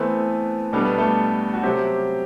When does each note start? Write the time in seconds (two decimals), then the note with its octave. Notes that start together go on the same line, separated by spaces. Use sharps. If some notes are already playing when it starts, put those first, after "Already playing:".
Already playing: E3 A3 B3 C4 B4
0.73 B2 G3 B3 D4 A4
0.85 B4
0.98 A3 A4
1.54 F#4
1.63 C3 F#3 C4 G4